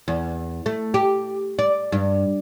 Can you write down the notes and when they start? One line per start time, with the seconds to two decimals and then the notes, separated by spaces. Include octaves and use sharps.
0.08 E2
0.66 A3
0.94 G4
1.59 D5
1.92 G2